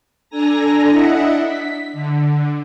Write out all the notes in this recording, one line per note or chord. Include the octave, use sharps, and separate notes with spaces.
D4 A4 G#5 A#5 A#6
D4 E4 D#5 E5 F#5
B6
D3